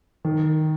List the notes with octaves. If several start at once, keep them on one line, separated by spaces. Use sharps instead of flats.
D#3